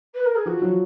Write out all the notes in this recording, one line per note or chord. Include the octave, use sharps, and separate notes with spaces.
B4
A#4
G#4
F3 F#4
F#3